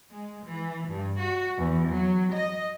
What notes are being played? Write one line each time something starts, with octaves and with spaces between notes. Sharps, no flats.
G#3
E3
G2
F#4
E2
F#3
D#5